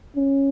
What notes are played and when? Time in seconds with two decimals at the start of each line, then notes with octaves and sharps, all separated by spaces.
0.16 C#4